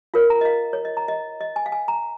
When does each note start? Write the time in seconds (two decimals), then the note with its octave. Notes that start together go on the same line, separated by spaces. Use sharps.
0.14 F4 A#4 C#5 F5
0.30 A#5
0.41 D#5
0.45 F5
0.73 C#5
0.85 D#5
0.97 A#5
1.08 D#5
1.41 D#5
1.56 G#5
1.66 F5
1.72 G#5
1.88 A#5